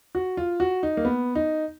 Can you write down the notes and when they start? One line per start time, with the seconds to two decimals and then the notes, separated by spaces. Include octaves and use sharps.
0.15 F#4
0.37 F4
0.60 F#4
0.83 D#4
0.97 A#3
1.05 B3
1.35 D#4